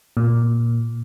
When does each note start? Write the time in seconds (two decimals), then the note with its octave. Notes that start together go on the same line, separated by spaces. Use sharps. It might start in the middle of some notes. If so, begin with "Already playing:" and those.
0.17 A#2